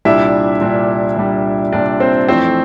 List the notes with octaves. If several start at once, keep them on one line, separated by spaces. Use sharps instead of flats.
C2 A#2 G3 D4 E4 E5
C2 A#2 G3 D4
C2 A#2 G3 D4
C2 A#2 G3 D4 D5
C4 C5
F2 E3 A3 C4 C5